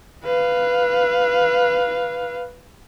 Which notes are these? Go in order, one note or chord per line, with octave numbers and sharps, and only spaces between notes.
B4 F5